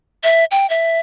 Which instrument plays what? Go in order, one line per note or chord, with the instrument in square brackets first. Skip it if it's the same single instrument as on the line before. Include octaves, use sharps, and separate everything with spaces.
[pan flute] E5
G5
E5